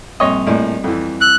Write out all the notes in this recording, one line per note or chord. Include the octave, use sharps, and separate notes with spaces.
A#1 G3 C4 C#5 D#5
A#1 A2 D5 D#5
F2 E3
E6 F#6